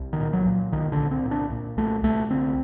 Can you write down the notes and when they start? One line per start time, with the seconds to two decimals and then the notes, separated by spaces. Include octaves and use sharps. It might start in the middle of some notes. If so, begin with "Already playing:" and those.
Already playing: C2
0.13 D#3
0.20 A#2
0.33 F#3
0.46 A#2
0.72 C2 D#3
0.92 D3
0.98 C2
1.11 C4
1.25 A#2
1.31 D4
1.51 A#2
1.77 C2 A3
2.03 C2 A3
2.30 D3 C4